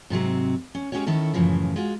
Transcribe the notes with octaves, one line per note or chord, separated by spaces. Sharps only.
G#2 C3 F#3 C4
C#4
G#3 C#4 F#4 G4 C#5
D#3 C#4 E4 A4
F#2 A2 C#3 E3 F3
G#3 F4 F#4